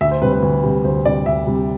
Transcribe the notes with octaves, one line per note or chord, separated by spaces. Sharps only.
D2 E5
C5
C3 G3 B4
B4
D2
C3 G3
D2 C5
C3 G3 D5
D2 E5
C3 G3